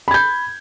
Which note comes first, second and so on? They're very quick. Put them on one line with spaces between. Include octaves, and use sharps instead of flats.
B5 G#6 G6